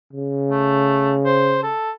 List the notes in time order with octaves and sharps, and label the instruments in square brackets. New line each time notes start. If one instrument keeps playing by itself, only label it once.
[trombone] C#3
[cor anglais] A3
C5
A4